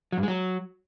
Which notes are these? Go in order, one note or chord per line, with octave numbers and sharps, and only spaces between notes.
F#3
G2
G#3
F#3